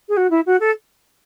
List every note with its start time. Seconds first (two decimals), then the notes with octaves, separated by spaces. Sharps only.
0.09 G#4
0.17 F#4
0.30 E4
0.46 F#4
0.60 A4